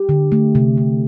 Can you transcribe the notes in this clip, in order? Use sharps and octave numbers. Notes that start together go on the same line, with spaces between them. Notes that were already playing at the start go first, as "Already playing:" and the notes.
Already playing: G4
D3
A3
C3
C3